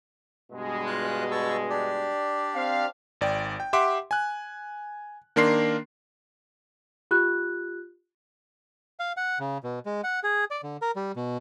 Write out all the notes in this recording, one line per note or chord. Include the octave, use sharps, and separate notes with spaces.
G2 B2 G#3
F4 F5 F#6
A5 C#6 E6
D4 G4 D5
C4 F5
G#1 D5 G5
G5
G4 E5 F#5 C6 D6
G#5 F#6
D#3 A#3 D4 A#4 C6 C7
F4 G4 F#6
F5
F#5
C#3
B2
G#3
F#5
G#4
D5
D3
A#4
G3
B2